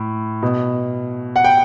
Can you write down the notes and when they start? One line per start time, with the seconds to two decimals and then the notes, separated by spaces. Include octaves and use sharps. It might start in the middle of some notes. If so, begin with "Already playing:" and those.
Already playing: A2
0.43 B2
1.36 F#5
1.44 G5